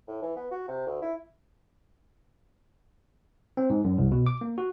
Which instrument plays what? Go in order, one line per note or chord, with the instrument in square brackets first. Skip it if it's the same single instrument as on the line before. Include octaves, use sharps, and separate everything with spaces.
[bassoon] A2
E3
B3
F#4
C3
D2
E4
[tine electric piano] C4
G#2
F#2
C2
B2
D6
A#3
F#4